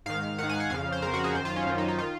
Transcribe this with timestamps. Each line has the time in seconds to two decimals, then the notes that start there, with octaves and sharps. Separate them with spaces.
0.06 G#2 D#3 F5
0.38 G#2 D#3 F#5
0.49 G#5
0.60 F#5
0.70 F2 C#3 F5
0.92 C5
1.02 F2 C#3 A#4
1.14 F#4
1.24 G#4
1.34 F#2 D#3 C5
1.45 F4
1.56 C#4
1.67 F#2 D#3 C#4
1.78 D#4
1.88 D#4
1.99 D#3 F4